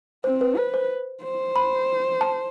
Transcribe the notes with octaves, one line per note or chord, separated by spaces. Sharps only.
C4 C5
B4
B4 C5
C5
C5
B5
A5